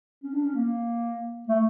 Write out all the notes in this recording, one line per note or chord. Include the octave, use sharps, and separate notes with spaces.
C#4
D4
C#4
A#3
A3